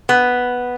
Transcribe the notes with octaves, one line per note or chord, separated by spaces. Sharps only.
B3